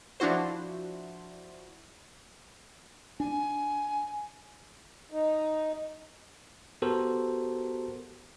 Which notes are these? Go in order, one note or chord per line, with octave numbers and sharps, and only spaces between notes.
F3 D4 E4 F#4 C5
D4 G#5
D#4
B3 F#4 G4 A4 A#4 C5